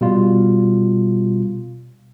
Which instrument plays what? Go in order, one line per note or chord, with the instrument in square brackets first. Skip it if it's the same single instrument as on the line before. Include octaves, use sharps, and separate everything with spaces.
[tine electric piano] B2 G3 F4